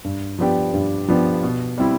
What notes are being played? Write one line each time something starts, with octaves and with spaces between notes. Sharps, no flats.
G2
F3 B3 D4 G4
G2
F3 B3 D4 G4
B2
G3 C4 E4